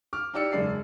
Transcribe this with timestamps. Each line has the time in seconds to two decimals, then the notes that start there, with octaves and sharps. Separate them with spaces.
0.13 D6 F6
0.34 D#4 E4 G4 D5 E6 C#7
0.52 E1 F#2 C#3 D5 C7